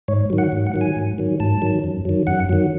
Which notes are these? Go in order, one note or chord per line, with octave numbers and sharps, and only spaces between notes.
G#2 C#5
D#3 F#3
F#5
G#2
F#5
D#3 F#3
G#5
G#2
D#3 F#3
G#2 A5
D#3 F#3
F#2
D#3 F#3
F#2 F#5
D#3 F#3